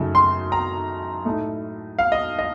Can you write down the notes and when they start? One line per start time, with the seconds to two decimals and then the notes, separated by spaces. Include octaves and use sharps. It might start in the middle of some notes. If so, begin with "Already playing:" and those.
Already playing: F#2 C#3 A3 D#4
0.15 C6
0.52 A#5
1.25 A2 A3 D#4
1.99 F5
2.12 D#5
2.39 D#5